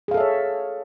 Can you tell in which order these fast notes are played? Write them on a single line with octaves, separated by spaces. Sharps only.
G#4 F5 A4 E5 C#5